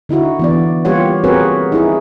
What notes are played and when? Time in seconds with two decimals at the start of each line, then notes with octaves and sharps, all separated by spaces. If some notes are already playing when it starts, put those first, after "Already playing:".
0.09 D3 D#4 E4 F#4
0.39 E3 B3 D5
0.85 G3 A#3 F4 G4 C#5 F#5
1.24 C4 F#4 G#4 A#4 B4 C#5
1.72 D#4 E4 G#4